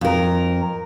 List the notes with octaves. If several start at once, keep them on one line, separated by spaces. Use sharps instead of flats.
F2 A#4